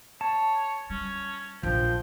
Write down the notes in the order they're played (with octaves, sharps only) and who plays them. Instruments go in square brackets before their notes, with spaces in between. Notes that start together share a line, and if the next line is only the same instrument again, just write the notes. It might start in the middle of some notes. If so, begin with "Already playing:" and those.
[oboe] C#5 [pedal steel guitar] A5
[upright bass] G3 [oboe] C#4
[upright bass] A#1 A#2 [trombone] F3 [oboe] G5